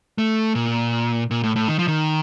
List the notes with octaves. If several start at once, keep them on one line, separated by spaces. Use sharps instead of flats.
A3
A#2
A#2
A2
A2
D#3
F3
D#3